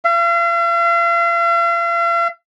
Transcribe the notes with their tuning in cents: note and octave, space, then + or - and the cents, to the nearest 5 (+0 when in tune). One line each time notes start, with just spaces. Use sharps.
F5 -45